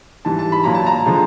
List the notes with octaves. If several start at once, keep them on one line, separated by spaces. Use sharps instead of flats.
G#2 E3 G3 A5
A5
B5
A#2 F#3 A#5
A5
A#5
D3 F3 G#3